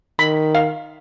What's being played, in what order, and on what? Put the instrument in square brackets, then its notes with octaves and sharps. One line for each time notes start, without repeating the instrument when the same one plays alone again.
[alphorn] D#3 [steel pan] B5
[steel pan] F5